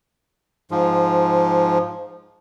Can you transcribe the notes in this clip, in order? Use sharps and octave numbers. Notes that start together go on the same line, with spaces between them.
G#2 F3